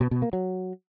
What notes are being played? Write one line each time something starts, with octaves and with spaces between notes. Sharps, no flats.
B2
B2
A#3
F#3